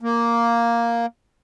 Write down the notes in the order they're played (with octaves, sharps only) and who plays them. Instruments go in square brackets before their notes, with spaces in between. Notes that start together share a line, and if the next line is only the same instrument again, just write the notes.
[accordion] A#3